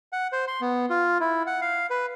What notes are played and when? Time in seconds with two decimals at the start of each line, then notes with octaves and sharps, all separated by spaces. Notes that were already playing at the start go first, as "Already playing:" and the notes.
0.13 F#5
0.32 C5
0.48 C6
0.61 B3
0.90 F4
1.21 E4
1.47 F#5
1.61 F5
1.90 B4